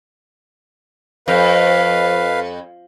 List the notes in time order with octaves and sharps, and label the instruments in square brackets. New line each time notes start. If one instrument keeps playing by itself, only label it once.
[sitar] F2 [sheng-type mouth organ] B4 F5